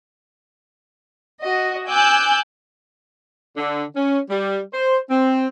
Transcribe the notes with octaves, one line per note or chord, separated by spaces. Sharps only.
F#4 D#5
G#5 D6 E6 F#6 G6
D3
C#4
G3
C5
C4